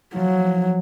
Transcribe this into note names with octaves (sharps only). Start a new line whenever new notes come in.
F3 F#3